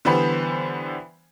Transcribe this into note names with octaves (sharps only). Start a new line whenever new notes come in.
D3 E3 G3 B3 C5 B5